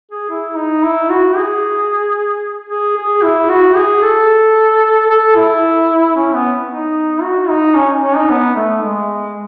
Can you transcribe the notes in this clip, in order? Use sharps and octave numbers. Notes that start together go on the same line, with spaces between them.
G#4
E4
D#4
E4
F#4
G#4
G#4
G#4
E4
F#4
G#4
A4
A4
E4
C#4
B3
D#4
F#4
D#4
C#4
C#4
D#4
B3
A3
G#3